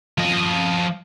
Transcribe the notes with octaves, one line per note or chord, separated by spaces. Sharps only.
F3 D#5